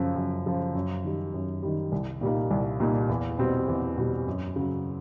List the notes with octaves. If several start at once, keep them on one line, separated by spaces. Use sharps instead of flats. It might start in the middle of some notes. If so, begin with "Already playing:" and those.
Already playing: F#2 C#3 F3
F#2
C#3 F3
F#2
D#3 G3
F#2
D#3 G3
C2
A#2 G3 A#3 D#4
C2
A#2 G3 A#3 D#4
E2
B2 G3 C4
E2
B2 G3 C4
F#2
C#3 F#3